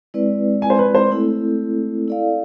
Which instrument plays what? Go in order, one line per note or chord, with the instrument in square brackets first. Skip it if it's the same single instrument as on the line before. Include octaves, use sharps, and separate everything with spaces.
[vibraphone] G#3 C4 E4 B4 D5
[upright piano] G#5
C5
B4
C5
[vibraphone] A3 C4 E4 A4
E4 A4 D5 F5